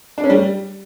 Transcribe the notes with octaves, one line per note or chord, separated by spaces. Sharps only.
D4
C#4
G3